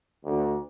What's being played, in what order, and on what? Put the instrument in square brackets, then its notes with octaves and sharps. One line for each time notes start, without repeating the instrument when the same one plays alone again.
[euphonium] D2